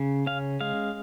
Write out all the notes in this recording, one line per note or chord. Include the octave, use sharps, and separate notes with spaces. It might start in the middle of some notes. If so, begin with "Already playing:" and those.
Already playing: C#3
C#4 F5
G#3 F5